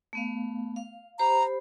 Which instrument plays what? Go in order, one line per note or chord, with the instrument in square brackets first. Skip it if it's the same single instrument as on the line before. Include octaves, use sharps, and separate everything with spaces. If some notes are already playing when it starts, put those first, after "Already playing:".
[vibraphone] A3 B3 F5
F5
[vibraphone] G4 C5 B5 [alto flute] A#5